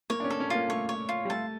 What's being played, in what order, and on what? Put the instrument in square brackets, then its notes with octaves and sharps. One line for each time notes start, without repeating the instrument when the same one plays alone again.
[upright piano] A#3 [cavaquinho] C#5
[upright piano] D4
C#4
[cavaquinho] A4
[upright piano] C#4
[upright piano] A#3 [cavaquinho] F4
[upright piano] A3 [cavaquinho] C#5
[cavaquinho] C#5
F4
[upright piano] G3
[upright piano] A3 [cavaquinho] A5